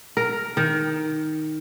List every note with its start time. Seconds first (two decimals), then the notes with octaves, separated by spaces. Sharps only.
0.17 A#4
0.57 D#3